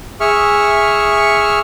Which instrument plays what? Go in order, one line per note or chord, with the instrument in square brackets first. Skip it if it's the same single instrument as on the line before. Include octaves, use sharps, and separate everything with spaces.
[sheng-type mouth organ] G#4 E5 C#6 F6